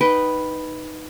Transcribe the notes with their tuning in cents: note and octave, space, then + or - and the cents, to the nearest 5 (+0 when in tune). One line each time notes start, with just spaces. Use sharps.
D#4 +0 B4 +0 G5 -20